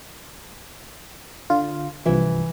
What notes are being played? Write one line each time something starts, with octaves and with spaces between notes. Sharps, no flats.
D3 F4
C2 G2 E3 F3 E5